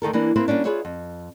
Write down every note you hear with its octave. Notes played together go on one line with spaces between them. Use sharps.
D2 D#3 A4 A#4
E3 A#3 D4 E4
A#3 C4 E4 B4 C5
G3 A#3 C#4 D4
F4 G#4 B4 C#5 E5
F2